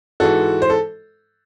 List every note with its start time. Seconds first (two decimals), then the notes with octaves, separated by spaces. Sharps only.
0.20 G#2 E3 G#3 F#4 A4
0.62 C5
0.70 A4